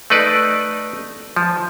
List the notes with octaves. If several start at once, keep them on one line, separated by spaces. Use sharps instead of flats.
A3 D#4 B4 D5
F3